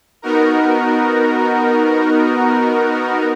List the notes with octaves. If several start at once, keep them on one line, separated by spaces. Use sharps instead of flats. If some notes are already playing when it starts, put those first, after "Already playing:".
B3 D#4 F#4 A#4